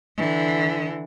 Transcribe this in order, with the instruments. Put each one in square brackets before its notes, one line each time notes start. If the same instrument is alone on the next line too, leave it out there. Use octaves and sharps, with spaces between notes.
[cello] D3 E3